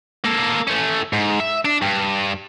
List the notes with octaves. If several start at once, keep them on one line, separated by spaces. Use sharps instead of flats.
A#3 A4
A3 C#4
G#2
E5
D4
G2